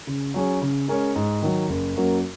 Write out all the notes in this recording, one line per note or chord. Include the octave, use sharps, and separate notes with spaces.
C#3
F#3 C#4 G#4 C#5
C#3
G#3 C#4 A#4 C#5
G#2
D#3 F#3
F#1
F#2 F#3 A#3 F#4